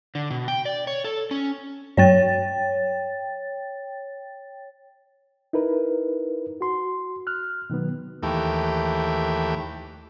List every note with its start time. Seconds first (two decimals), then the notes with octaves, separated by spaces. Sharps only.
0.15 D3
0.31 B2
0.48 G5
0.65 D5
0.87 C#5
1.04 A4
1.31 C#4
1.97 G2 F#3 C#5 G5 A6
5.53 D#4 E4 A#4 B4
6.61 F#4 C6
7.27 F6 F#6
7.70 B2 D#3 F#3 B3
8.23 D#2 E3 A3 G4